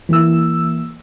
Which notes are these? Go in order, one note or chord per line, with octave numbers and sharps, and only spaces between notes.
E3 A#3 E4 E6